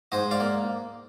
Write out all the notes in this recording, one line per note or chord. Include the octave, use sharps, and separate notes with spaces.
G#2 C5 D#5
D5 F5
A#3